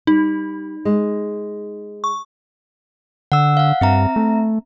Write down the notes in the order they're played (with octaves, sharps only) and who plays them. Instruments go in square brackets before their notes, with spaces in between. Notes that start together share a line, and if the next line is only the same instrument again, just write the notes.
[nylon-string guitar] G3 [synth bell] D#4
[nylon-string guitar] G#3
[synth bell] C#6
[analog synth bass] D3 [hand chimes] F#5 E6
[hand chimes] F5 F#5
[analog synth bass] G2 [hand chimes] C4 E5 A#5
[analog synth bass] A3